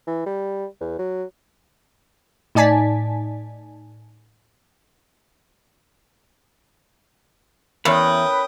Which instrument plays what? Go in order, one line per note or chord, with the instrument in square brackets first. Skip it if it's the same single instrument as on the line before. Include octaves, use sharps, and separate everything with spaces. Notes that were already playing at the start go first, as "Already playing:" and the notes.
[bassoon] E3
G3
E2
F#3
[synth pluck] A2 D#4 D5 G#5 A5 B6
[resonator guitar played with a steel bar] E2 [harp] C#4 A#4 C#5 [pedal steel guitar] B4 [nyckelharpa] G5 D#6